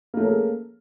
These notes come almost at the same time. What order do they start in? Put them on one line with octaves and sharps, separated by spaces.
A#3 A3 C#4 A#4 G#4